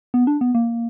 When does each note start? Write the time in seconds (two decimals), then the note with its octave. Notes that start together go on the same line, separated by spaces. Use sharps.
0.14 B3
0.27 D4
0.41 B3
0.55 A#3